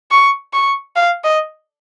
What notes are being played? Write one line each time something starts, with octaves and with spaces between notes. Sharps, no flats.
C#6
C#6
F5
D#5